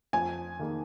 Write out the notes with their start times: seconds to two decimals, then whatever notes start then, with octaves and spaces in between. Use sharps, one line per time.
0.13 F2 G#5
0.59 D#3 A#3 D#4 G#4